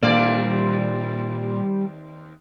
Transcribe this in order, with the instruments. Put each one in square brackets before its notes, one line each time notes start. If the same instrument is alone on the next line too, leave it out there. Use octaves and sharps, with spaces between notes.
[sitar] D#2 C4 D5 [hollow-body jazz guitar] A#2 D4 [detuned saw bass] G3 [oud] A#3